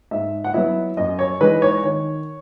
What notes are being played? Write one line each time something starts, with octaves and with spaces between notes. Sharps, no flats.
G#2 E5
F#5
F#3 B3 E4 E5
F#2 D#5
C#5
E3 G#3 D#4 B4
C#5
D#3 C#5